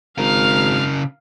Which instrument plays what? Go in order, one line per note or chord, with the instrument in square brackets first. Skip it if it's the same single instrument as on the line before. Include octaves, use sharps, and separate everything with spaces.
[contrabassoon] G#1 [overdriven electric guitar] C#3 A#4 [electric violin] F5 F6